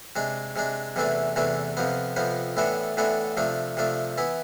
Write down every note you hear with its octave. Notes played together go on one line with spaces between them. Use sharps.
C3 G#3 D4
C3 G#3 D4
E2 C3 E3 A3 D4
E2 C3 E3 A3 D4
F2 C3 F3 B3
F2 C3 F3 B3
A2 E3 B3 D4 A4
A2 E3 B3 D4 A4
C3 F3 A3 D4
C3 F3 A3 D4
E3 B3 E4